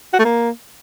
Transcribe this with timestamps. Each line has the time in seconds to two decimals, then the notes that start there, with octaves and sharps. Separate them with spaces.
0.14 F#4
0.19 A3
0.25 A#3